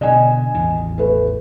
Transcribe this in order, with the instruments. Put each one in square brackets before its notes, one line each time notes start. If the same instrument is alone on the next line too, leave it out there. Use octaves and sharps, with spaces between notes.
[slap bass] B2 D3 [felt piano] D#5 G#5
[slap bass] A1 E2 D#3
[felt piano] A3 B4